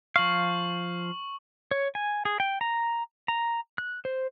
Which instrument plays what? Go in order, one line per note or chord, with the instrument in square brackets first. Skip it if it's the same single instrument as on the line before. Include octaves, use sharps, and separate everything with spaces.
[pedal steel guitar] F3 F5 [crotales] C#6 F#7
[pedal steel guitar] C#5
G#5
G#4
G5
A#5
A#5
F#6
C5